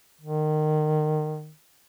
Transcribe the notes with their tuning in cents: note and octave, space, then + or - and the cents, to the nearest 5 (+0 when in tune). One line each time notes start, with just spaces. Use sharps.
D#3 -25